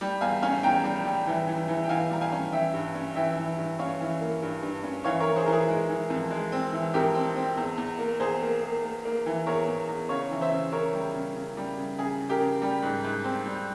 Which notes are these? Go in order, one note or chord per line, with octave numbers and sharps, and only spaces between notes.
G3
E2 F5 G#5
C#4 F5 G#5
E2 G5 A#5
G3
G3
E3
E3
E3
G5
E3 F5 G#5
G3 A#5
F5 G#5
C#4
E3 E5 G5
G2
C#4
E3 E5 G5
E3
G2
C#4 C#5 F5
E3
A#3
G2
G2
C#4
E3 C#5 F5
A#4 C#5
E3
G#4 C5
E3 A#4
G#4
G#3
E3
F2
G#3
C4
E3
F2 G4 A#4
C4
C4
E2
E2
A#3
E2 G#4 C5
A#3
A#3
A#3
A#3
E3
E2 A#4 C#5
E2
E2
C#3 C#5 F5
E3
C5 E5
C#3
C#3 A#4 C#5
G3
C#3
C#3
G3
C#3
C#3 G#4
C#3
G4 A#4
C#3
G3
G#2
G#2
C4
G3